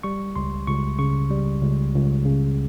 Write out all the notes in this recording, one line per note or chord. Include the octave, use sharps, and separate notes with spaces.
G3 C#6
C#2 C6
C#2 C#6
C#3 C#6
G3
C#2
C#2
C#3